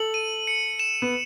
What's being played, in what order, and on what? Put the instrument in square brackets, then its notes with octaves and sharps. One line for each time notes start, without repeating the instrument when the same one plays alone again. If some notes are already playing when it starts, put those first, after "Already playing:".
Already playing: [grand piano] A4 [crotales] F#7
[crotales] D#7
C#7
E7
[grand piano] B3